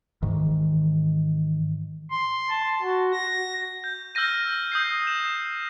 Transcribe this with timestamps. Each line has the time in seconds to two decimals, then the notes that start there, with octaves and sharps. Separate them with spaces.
0.22 G#2 D#3 E3
2.10 C6
2.50 A5
2.82 F#4
3.13 A#6
3.84 G6
4.15 E6 F6 G6 A#6 D#7
4.72 D#6 G6 C7
5.07 E7